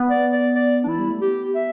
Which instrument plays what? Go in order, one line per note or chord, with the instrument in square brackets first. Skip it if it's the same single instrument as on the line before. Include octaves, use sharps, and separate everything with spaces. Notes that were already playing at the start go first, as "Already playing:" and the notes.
Already playing: [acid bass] B3
[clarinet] D5
D5
D5
D4
[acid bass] E3 [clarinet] E4
[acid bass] G3
A3
[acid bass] B3 [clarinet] G4
[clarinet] E5